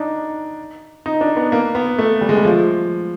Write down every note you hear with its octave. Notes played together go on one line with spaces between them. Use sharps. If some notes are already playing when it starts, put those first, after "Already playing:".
Already playing: D4 D#4
D#4
D4
B3
A#3
B3
A3
G3
G#3
G3
F3